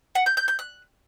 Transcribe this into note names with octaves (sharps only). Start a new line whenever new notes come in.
F#5
G6
G6
G6
F#6